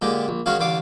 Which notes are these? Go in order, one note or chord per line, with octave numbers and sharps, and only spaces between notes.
A#2 D3 G#3 G4
A#1
D#3 G#3 C#4 F#4 F5
A1 D3 F5 D6